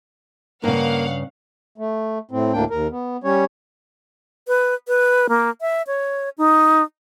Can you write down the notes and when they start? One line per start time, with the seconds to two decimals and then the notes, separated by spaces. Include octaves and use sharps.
0.64 G2 C#3 A#3 F5 F#5
1.78 A3
2.31 A2 C4
2.53 D2 A2 A#3 D4 G5
2.70 D#2 A#4
2.91 B3
3.24 G3 C#4 C#5
4.48 B4
4.88 B4
5.29 A#3
5.61 E5
5.87 C#5
6.38 D#4